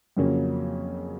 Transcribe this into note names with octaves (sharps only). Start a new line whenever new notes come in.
F2 C#3 F#3 A#3 C#4